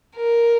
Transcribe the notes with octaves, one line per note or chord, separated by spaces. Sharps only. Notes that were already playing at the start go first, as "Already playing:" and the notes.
A#4